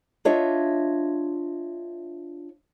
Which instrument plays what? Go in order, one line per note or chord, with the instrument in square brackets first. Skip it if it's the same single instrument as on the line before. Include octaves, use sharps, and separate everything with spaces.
[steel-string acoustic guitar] D4 F4 C#5 D#5 E5